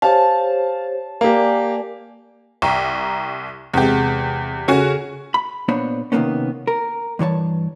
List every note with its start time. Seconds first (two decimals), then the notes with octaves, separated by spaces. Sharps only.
0.02 G4 C5 C#5 F5 A5
1.21 A#3 G4 A#4 D5 G#5
2.62 C2 G5 A#5 C#6
3.74 E2 C3 G#3 G4
4.68 C#3 C#4 F#4 A4 G#5
5.34 B5
5.68 A#2 B3 D4 C5 C#5 B5
6.12 C3 D#3 F3 A#3 B3 C#4
6.67 A#4
7.19 G2 E3 C#5 A5